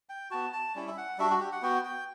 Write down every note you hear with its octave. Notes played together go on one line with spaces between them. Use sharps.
G5
B3 F#4 A5
A5
G3 C#4 E4
E5
F#5
G3 D4 F#4 E5
F#4
G4
F#5
B3 F#4 G5
G5